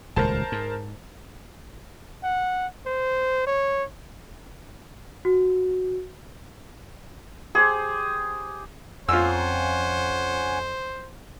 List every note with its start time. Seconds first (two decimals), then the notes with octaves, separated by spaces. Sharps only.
0.16 D#1 C#2 A2 A#4 C5 A5
0.52 G#2
2.24 F#5
2.86 C5
3.47 C#5
5.25 F#4
7.55 G4 G#4 C5
9.09 F2 C#4 F4 C5 F#5 G#5 E6